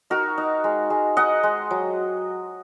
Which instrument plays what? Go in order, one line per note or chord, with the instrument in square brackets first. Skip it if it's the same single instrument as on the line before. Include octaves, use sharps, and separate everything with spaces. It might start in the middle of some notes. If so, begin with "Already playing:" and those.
[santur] D#4 F#4 A#4
D#4
G#3
G#3
D#4 D#5 F#5
G#3
F#3